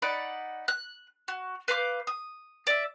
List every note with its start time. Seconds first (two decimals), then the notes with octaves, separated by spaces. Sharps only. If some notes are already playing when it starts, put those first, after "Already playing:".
0.02 D#4 D5 F#5 B5
0.68 F#6
1.28 F#4
1.68 B4 F5 D6 G6
2.07 D#6
2.67 D5 E5